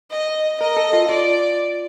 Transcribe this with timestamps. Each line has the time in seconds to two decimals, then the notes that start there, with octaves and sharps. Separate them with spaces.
0.11 D#5
0.61 A#4 D#5
0.77 A4
0.93 F4
1.09 F4 D5